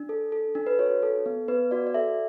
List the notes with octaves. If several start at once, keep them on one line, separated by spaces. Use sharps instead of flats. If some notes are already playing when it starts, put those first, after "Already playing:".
Already playing: D4
A4
A4
D4
B4
F#4 C#5
A4
B3
B3 B4
F#4 D5
D5
A4 E5